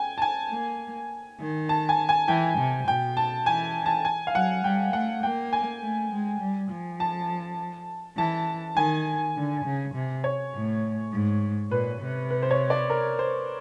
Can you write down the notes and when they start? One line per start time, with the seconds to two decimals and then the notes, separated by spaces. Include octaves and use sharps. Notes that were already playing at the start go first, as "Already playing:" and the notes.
Already playing: G5 G#5
0.18 A5
0.22 G#5
0.51 A#3
1.40 D#3
1.69 A5
1.89 G#5
2.09 G#5
2.28 E3 G5
2.58 C3
2.88 B2 G5
3.17 A5
3.46 E3 G#5
3.86 A5
4.05 G#5
4.27 F5
4.34 F#3 F#5
4.64 G3 G5
4.93 A3 F#5
5.23 A#3 G5
5.53 G#5
5.82 A3
6.12 G#3
6.41 G3
6.71 F3
7.00 A5
8.17 E3 A5
8.76 D#3 G#5
9.36 D3
9.65 C#3
9.95 C3
10.24 C#5
10.54 A2
11.13 G#2
11.71 A#2 B4
12.02 C3
12.30 B4
12.42 C5
12.51 C#5
12.70 D5
12.90 A#4
13.19 C5